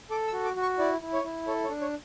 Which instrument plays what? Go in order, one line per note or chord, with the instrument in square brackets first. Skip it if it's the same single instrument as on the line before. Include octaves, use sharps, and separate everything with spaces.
[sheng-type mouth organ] A4 D6
E6
F#4
D6
F#4
C#6
E4 D5
E4
C#5
E4
A4 C#5
C#5
D4
C#5